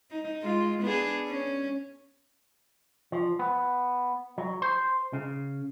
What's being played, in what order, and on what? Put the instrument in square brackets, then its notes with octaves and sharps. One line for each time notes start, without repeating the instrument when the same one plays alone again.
[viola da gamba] D#4
G#3 F4
B3 D4 G#4
C#4
[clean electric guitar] F3
B3
F#3
C5
C#3